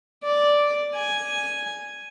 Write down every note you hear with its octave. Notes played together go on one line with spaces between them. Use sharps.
D5
G#5